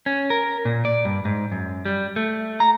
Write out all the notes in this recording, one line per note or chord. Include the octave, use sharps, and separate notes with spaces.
C#4
A#4
A#2
D5
G2
G#2
F#2
G3
A3
A#5